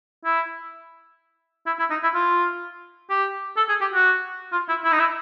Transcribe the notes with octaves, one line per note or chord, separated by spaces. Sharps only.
E4
E4
E4
D#4
E4
F4
G4
A4
G#4
G4
F#4
F4
E4
E4
D#4
E4